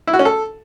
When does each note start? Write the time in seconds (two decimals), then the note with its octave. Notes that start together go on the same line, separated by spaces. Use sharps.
0.07 E4
0.13 F#4
0.19 C#4
0.25 A4